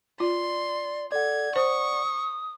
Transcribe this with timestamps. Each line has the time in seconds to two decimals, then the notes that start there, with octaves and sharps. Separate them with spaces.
0.20 F4 D5 C6
1.12 A4 D5 F#5 G#6
1.56 C5 C#6 D#6